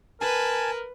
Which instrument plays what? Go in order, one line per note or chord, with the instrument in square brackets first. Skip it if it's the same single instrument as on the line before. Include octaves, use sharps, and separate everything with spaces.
[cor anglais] A#4 [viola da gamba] B4 [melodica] G#5 A5